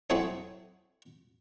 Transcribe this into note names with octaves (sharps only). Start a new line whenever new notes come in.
F#3 C4 E4 G#4 A4 C#5